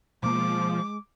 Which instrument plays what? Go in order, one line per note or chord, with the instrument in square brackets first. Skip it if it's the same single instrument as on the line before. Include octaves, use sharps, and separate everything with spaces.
[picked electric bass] B2 A#3 [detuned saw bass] F3 [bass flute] G#3 [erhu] D6